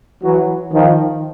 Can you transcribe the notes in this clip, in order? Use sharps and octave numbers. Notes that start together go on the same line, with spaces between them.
E3 F#3
D#3 F3